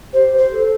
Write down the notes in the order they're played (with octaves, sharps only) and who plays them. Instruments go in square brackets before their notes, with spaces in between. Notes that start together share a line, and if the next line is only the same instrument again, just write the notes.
[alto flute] G4 [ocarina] C5
[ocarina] C5
[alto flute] A4